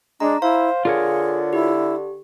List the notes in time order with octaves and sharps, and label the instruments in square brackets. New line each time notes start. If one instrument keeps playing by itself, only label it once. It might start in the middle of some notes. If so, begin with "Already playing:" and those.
[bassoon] G#3 [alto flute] D4 [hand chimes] A#5
[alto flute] E4 [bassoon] C5 [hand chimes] F5
[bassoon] D3 [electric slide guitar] F4 A#4 C#5 [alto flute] G#4
[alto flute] E4 [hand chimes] G4